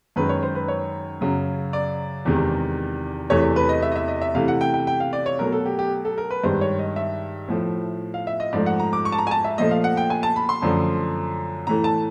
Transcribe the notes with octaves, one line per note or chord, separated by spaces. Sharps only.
F#2 D#3 G#3 B4
C#5
C5
B4
C#5
F#2 C#3 F#3
D5
E2 C3 D#3 G#3
E2 C3 E3 A3 C#5
B4
D#5
E5
D#5
E5
D#5
E5
C3 E3 A3 F5
F#5
G5
G5
G5
F5
D5
C#5
B2 F#3 A3 A#4
A4
G4
G4
A4
A#4
B4
G2 D#3 G#3 C5
C#5
D#5
E5
A2 F3 A3
F5
E5
D#5
G#2 F3 A3 D5
F#5
A#5
D6
C#6
A5
A#5
G#5
A5
E5
A#2 F3 A3 D#5
F5
F#5
G5
G#5
A5
B5
C6
F#2 D3 F3 A3
A2 E3 A3 A#5
A5